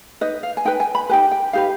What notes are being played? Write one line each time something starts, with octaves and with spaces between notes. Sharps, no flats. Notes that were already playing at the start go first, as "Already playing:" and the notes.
D#4 B4 D#5
F5
G#5
D#4 B4 G5
G#5
B5
D#4 G4 B4 G#5
G5
D#4 G4 B4 F5